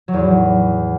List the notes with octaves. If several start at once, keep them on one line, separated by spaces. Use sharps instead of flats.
F#3
E2
A2